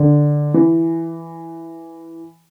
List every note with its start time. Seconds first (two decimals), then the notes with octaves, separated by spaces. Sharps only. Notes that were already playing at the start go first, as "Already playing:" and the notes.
Already playing: D3
0.54 E3